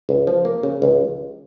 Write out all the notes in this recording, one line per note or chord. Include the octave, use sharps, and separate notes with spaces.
C#2
F3
A#3
C#3
C#2